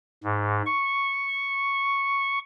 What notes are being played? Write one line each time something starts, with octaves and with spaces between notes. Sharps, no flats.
G#2
C#6